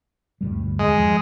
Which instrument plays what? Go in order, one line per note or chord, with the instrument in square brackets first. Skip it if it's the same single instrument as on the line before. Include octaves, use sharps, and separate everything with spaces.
[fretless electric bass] D2 G2 G3
[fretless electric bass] E2 [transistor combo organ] G#3
[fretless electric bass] F3